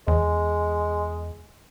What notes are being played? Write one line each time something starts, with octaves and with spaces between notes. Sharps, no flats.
E2 G#3